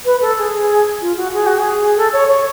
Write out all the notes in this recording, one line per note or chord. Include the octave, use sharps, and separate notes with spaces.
B4
A4
G#4
F4
F#4
G#4
F#4
G#4
A4
C#5
C#5